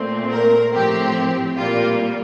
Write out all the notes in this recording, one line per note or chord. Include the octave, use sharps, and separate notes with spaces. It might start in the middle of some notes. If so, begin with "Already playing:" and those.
Already playing: A#2 A3 C4
A#4
A2 F3 C4 G4
A#2 G3 A#3 F4